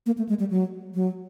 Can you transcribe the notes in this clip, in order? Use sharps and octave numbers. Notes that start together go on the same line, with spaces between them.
A#3
A3
G#3
G3
F#3
F#3